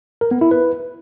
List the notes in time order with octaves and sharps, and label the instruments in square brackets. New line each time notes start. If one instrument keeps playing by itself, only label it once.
[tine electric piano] A#4
B3
E4
B4